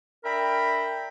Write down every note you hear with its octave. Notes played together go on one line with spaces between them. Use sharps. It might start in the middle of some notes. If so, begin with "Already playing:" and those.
D4 A#4 E5 G5 A#5 B5